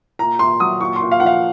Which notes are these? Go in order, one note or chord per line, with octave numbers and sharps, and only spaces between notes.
A#2 A#5
A#2 C6
F#3 D#6
A#2 C#6
C6
A#2
F5
F3 F#5
F5